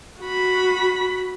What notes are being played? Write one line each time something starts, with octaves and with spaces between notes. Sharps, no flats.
F#4 B5